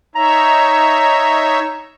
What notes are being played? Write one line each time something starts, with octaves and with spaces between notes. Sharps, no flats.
D#4 C#5 E5 A#5